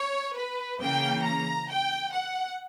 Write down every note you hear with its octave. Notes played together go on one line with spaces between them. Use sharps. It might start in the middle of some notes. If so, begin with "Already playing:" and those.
Already playing: C#5
B4
C#3 E3 A#3 G5
A#5
G5
F#5